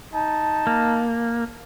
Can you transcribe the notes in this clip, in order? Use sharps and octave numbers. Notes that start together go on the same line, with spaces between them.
D#4 A5
A#3